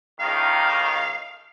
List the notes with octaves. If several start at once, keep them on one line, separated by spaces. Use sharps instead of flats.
C#2 A2 D#3 F5